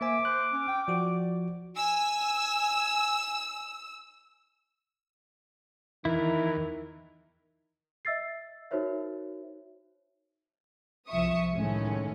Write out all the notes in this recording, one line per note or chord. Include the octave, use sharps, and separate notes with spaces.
A#3 C5 E5 G#5 D6
C5 F#6
C#4
G5
F3 F#4 D5
G#5 E6
E2 D#3 E3 E4 A#4
D#5 E5 E6 A6 C7
D#4 F#4 A#4 C5 C#5 E5
C2 F3 E5 C#6 D#6
A2 D#3 G#3 A3 C#4